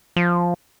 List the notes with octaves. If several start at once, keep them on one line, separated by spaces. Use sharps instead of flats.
F3